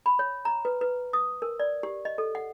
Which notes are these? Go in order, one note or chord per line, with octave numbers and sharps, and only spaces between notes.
B5
C#5
A#5
B4
B4
D#6
A#4
D5
G4
D#5
A4
F#5